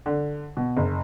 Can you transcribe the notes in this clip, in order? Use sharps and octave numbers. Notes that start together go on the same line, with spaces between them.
D3
B2
F#1